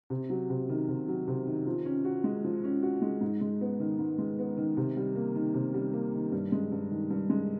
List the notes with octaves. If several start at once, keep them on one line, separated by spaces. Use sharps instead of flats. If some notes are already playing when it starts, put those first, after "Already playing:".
C3
F#3
C3
D#3
C3
F#3
C3
D#3
F3
C#4
F#4
G#3
F3
C#4
F#4
G#3
G#2
G#3
B3
D#3
G#2
G#3
B3
D#3
C3
G3
A#3
D#3
C3
G3
A#3
D#3
G2
G#3
G2
D#3
G2
G#3